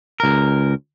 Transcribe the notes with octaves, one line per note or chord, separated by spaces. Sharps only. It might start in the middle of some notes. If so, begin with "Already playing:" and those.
C#2 A#4